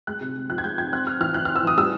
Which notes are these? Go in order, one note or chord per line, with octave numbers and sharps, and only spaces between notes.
G#3 F#6
C3
C3
F3 F#6
G#6
G#3 G6
F3 G#6
C4 F#6
C4 F6
E3 F6
E3 F#6
C4 F6
E6
E3 D#6
G3 E6